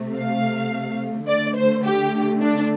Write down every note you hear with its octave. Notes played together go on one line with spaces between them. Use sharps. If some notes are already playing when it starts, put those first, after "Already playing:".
Already playing: C3 A3
F5
D3 A3 D5
C5
G4
D4